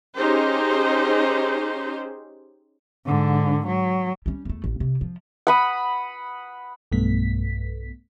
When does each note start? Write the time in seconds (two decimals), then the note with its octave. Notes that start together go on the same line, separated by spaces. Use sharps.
0.16 C#4 D#4 G4 G#4 C5
3.06 G#2 D3
3.67 F#3
4.26 G3 C#4
4.45 E2 A3
4.64 A1
4.80 C3
5.01 F3
5.47 F#5 B5 D#6
6.92 B1 G2 A3 B3 B6